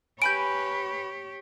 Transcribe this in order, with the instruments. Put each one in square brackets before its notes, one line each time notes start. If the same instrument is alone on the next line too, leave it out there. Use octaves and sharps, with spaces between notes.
[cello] G4 C#5 [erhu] B4 [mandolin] G#5 B5 G6 [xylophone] D7